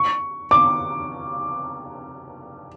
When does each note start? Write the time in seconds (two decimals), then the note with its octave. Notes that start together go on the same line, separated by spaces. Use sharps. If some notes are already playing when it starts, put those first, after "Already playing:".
Already playing: C#6
0.51 D6